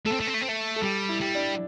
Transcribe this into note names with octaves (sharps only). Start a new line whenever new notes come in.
A3 A4
C4
A3
C4
A3
C4
A3
A4
G3 G4
E4
G3
D4